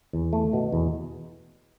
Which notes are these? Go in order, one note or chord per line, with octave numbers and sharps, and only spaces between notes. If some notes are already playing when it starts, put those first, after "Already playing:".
E2
A3
B2
E2